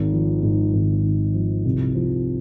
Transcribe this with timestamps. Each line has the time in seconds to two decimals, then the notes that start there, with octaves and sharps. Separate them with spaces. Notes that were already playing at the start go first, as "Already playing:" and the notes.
Already playing: G#1
0.12 F3
0.43 G#2
0.73 G#1
1.04 G#1
1.35 F3
1.65 C2
1.95 F3